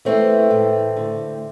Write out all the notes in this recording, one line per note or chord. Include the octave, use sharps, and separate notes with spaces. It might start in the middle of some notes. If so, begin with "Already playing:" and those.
E3 A3 C4
A2
D3